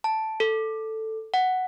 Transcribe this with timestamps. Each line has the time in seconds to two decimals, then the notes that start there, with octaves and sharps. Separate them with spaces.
0.04 A5
0.40 A4
1.34 F#5